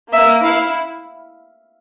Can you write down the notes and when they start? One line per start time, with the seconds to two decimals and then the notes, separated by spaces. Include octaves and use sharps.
0.13 A#3 E5
0.43 E4 F5